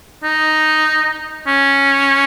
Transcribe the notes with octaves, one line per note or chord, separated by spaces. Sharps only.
D#4
C#4